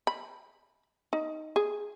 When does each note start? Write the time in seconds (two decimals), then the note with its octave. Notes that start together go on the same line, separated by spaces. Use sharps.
0.07 B5
1.13 D#4
1.56 G#4